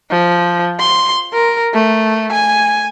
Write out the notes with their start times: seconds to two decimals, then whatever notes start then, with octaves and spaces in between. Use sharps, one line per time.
0.10 F3
0.80 C6
1.33 A#4
1.74 A3
2.32 G#5